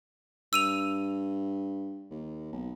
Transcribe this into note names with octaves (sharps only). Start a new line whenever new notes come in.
G2 E6 D#7 F7
D#2
B1